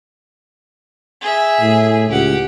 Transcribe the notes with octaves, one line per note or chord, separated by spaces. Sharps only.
G#4 E5
A2
C#2 G4 F#5